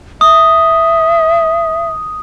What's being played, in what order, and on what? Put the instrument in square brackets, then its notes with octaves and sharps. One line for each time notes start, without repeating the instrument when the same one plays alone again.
[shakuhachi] E5 [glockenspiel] D#6